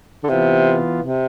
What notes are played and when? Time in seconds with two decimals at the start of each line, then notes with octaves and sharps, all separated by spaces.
0.23 D3
0.29 C3 E3 B3 F4
1.00 C3